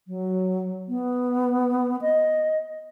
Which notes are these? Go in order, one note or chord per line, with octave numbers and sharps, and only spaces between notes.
F#3
B3
D#5